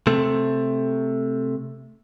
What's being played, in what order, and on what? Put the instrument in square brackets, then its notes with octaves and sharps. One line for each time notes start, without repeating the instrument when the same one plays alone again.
[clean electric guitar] C3 A3